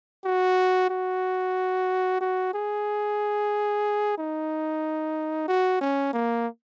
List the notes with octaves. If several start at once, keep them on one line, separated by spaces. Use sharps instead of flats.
F#4
F#4
F#4
G#4
D#4
F#4
C#4
A#3